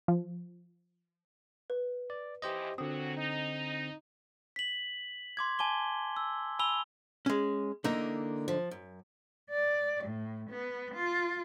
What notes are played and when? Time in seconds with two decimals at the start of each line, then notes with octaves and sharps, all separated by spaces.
0.08 F3
1.70 B4
2.10 D5
2.42 D#2 E3 G4 C5 D#5
2.78 A#2 D3 F#3 C4 F#4 D#6
3.16 D#4
4.56 B6 F#7
5.37 C6 D6 G#6
5.59 G#5 A5 D6 G7
6.17 E6
6.59 G#5 B5 E6 F7 G7
7.26 G#3 C#4
7.84 D3 E3 A#3 D#4 D#5
8.48 F3
8.71 F#2
9.49 D5
10.04 A2
10.50 B3
10.93 F4